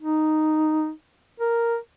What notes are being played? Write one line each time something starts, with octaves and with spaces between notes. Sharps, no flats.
D#4
A#4